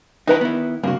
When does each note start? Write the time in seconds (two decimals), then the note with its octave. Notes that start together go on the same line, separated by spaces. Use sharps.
0.27 D#3 D#4 E4 B4 A#5
0.41 B3 E4
0.84 C#2 G2 C3 A#3 F#4